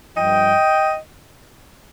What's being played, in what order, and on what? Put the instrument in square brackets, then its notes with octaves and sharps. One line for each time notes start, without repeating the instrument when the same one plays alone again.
[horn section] G2 F3 D#5 G5